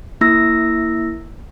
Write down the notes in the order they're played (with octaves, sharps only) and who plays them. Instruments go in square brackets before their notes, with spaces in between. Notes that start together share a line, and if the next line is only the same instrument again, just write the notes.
[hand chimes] A#3 E4 E6 A#6